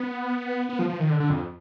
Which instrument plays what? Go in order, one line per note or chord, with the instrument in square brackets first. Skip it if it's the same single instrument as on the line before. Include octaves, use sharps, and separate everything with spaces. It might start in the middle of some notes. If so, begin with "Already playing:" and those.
Already playing: [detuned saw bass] B3
B3
F3
F3
D#3
D3
D3
F2